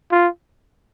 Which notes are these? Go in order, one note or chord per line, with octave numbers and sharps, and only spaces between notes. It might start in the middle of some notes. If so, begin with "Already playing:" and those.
F4